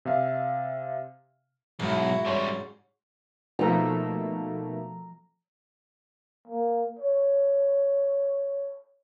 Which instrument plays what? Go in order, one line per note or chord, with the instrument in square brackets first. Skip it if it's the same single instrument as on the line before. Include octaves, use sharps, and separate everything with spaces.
[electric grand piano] C3 E5 F5
[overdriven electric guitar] B1 [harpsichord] G#2 [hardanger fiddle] E4 F#4
[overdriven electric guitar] C#3 G3 [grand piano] C#5 C6 C#6
[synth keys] B2 A3 A#3 [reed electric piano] F3 [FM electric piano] D#4 [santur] A#5 E6
[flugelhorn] A#3
C#5